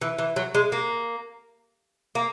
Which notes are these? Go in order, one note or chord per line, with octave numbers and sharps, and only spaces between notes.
E3
E3
F#3
G#3
A#3
A#3